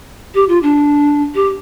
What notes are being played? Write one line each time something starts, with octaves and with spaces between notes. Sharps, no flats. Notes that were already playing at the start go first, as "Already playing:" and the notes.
G4
F4
D4
G4